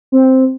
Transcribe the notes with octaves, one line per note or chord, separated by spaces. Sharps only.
C4